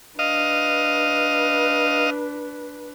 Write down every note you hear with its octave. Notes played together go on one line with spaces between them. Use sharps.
D4 B4 D#5 F5